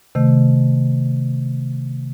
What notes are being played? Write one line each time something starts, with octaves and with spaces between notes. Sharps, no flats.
C3 D#3 A3